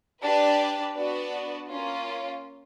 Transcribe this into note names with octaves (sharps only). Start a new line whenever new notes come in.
D4 G4 B4 D5
B3 D4 F#4 B4 D5
A#3 C#4 F4